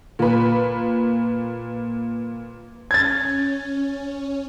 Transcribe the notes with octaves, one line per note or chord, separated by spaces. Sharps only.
A#2 B4
C#4 G#6 A6